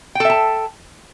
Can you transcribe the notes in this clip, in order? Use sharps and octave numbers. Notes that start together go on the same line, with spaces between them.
A4 E5 G5 A5